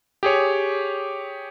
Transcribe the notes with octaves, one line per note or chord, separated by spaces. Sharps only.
G4 G#4 C#5